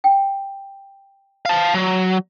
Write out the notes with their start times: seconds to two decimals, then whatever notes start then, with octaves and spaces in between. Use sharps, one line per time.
0.04 G5
1.46 F5 A5
1.74 F#3